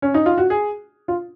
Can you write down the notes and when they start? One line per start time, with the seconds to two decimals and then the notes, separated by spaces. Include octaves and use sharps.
0.02 C#4
0.14 D#4
0.26 F4
0.38 F#4
0.50 G#4
1.08 F4